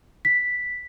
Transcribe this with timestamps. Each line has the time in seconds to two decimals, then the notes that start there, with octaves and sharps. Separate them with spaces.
0.25 B6